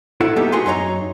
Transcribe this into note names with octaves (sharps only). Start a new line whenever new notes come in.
E4 F#4 A4 F#5
G3 A#3 B3 D#4 G4 A4
D#4 F#4 G#4 B4 C6
F#2 D#4 C#5 A#5